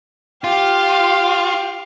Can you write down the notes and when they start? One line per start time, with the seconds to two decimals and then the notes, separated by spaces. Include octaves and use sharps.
0.44 F4 G4 F5